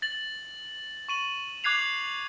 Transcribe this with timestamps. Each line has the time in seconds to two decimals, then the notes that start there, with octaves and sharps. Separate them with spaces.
0.02 A6 F#7
1.09 C#6 D#7 F#7
1.64 D6 F#6 G#6 C7 F7